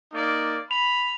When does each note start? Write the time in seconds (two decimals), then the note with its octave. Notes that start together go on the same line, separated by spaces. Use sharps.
0.13 A#3 D#4 D5
0.71 B5 F7